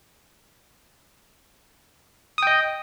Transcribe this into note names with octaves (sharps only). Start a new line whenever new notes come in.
D#5 G5 D#6